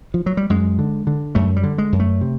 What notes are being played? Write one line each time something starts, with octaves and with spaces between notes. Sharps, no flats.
F3
F#3
G3
F#2 G#3
D3
D3
F#2 A3
G3
D3
G#3
F#2
A3
C3